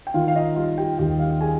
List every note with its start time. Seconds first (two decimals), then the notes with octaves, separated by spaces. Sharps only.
0.07 G5
0.14 D#3 F4 F5
0.28 F5
0.35 D#4 D#5
0.56 G3 F4 F5
0.78 G4 G5
0.99 D#2 G4 G5
1.19 F5
1.31 G5
1.41 G#4 G#5